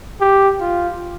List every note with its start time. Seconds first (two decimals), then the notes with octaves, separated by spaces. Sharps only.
0.21 G4
0.61 F4